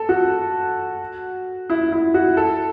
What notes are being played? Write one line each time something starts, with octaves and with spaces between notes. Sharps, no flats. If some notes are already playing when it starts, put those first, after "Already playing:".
Already playing: A4
F#4
E4
E4
F#4
A4